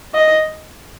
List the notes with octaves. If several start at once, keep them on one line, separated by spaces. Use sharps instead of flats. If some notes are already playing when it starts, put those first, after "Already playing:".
D#5